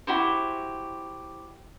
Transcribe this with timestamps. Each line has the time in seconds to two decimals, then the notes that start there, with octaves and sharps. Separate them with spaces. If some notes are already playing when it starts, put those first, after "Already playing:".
0.07 E4 F#4 G4 C5